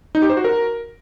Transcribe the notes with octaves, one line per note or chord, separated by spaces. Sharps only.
D#4
G4
C5
F#4
A#4